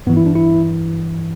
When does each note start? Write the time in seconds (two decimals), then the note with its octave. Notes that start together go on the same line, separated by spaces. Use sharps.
0.07 G2 B3
0.09 E3
0.17 E4
0.26 D4
0.35 E4